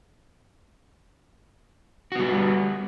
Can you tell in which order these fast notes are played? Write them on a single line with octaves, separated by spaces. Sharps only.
F#4 B3 G3